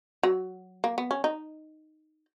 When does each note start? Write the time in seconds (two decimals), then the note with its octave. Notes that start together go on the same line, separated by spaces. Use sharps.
0.23 F#3
0.84 A#3
0.98 B3
1.11 C#4
1.24 D#4